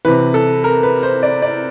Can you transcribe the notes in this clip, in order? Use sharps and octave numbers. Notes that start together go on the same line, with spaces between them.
C3 E3 B4
A4
A#4
B4
C5
D5
D5